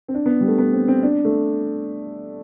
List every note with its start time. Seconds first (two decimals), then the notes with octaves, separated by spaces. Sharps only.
0.08 C4
0.14 D4
0.26 B3
0.41 G3
0.48 A3
0.58 B3
0.73 C4
0.88 C4
1.03 D4
1.25 A3